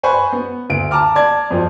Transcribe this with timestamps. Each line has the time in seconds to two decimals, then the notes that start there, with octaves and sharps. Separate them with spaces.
0.03 B4 C5 G#5 B5 C#6
0.32 B3
0.70 D2 D7
0.91 A5 A#5 D6 F6
1.15 D5 A5 G#6
1.50 F2 F3